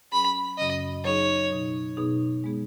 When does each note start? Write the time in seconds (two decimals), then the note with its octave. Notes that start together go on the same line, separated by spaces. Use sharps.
0.12 F#3 C#4 G#4 B5
0.58 F#2 C#3 F#3 C#4 D#5
1.04 F#3 D#4 G#4 C#5
1.50 B2 F#3 D#4
1.97 B2 B3 D#4 G#4
2.44 G#3 B3 G#4